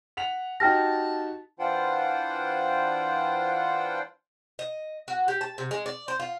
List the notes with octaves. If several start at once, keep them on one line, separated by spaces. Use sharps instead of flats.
F#5 B6 F7
D#4 F#4 G4 G5 A5 F6 A#6
E3 D4 F4 C5 F#5 G5
D#5
F#4
G4
A5
C3
G#3
D5
C5
F4